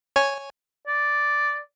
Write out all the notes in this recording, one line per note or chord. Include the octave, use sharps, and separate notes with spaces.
C#5 G#5
D5